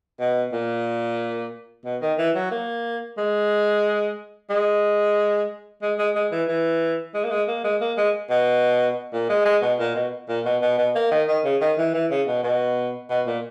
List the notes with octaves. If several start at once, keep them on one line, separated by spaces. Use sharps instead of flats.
B2
A#2
B2
D#3
E3
F#3
A#3
G#3
G#3
G#3
G#3
G#3
E3
E3
G#3
A#3
G#3
A#3
G#3
A#3
G#3
B2
A#2
G#3
G#3
B2
A#2
B2
A#2
B2
B2
B2
A#3
D#3
D#3
C#3
D#3
E3
E3
C#3
B2
B2
B2
A#2